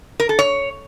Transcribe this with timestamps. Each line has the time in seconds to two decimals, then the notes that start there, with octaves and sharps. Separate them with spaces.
0.20 A#4
0.29 A4
0.39 C#5